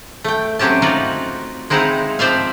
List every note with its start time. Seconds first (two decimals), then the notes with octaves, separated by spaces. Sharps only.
0.24 A3 G5
0.59 F#3 C4 C#4 G4 A5
0.82 D#4 F4 F#4 D5
1.70 G#3 C4 D#4 E4 F5 F#5
2.19 F3 C4 C5 D5 E5 F5